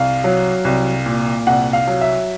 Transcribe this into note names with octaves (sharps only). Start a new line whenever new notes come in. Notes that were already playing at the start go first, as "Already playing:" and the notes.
Already playing: C2 F5
F#3
C2
A#2
C2 F#5
F5
F#3
E5